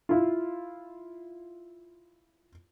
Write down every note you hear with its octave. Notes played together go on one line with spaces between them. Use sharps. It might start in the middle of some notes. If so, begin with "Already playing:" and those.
E4 F4